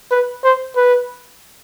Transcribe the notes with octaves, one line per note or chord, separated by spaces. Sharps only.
B4
C5
B4